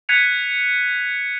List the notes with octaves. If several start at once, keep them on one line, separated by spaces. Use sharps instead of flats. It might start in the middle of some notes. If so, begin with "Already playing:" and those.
F#6 G#6 B6 C#7 D#7 F7